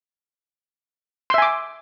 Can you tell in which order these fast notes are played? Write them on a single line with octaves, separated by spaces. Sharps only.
C6 E5 G#5 D6